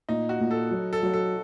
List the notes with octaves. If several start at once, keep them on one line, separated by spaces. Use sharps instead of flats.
A#2 D#4
F#4
A#2
A4
F#3
A4
F#3
A4